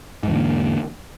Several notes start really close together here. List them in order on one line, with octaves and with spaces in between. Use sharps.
G#2 E2 D3 A#3